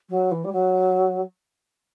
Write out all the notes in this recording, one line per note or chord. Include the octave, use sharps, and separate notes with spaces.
F#3
E3
G3
F#3